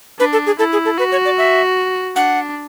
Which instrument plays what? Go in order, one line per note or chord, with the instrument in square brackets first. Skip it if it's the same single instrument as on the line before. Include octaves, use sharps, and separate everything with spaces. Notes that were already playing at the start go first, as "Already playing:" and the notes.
[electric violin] D4 [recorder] B4
[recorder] A4
G#4
[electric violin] E4 [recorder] A4
[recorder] G#4
A4
[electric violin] F#4 [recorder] B4
[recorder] C#5
D5
E5
[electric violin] D4 [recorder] F#5